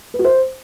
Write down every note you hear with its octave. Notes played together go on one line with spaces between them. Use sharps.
B4
F#4
C5